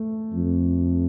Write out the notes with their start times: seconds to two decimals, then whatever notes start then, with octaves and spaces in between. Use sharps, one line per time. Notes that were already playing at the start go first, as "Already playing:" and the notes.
Already playing: A3
0.33 F2